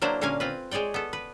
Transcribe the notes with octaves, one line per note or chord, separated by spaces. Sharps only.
F#3 A#3 D4 E4 C5
A#2 D3 A#3 C#4 F5 G#5
C4 F4 B4
G#3 G#4 C#5 D5 G5
B3 A4
B4